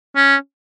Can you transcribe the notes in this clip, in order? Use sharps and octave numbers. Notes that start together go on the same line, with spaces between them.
C#4